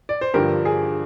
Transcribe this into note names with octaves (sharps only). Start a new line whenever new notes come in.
D5
C5
G2 D3 F3 G4 A#4
G#4